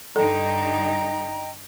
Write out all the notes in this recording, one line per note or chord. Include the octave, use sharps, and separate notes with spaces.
G2 D3 D#4 A4 D#5 G5 A#5